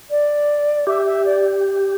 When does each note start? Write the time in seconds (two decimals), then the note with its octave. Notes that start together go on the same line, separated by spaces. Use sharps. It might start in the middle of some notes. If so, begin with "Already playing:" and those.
0.10 D5
0.87 G4 E5
1.06 E5
1.25 D5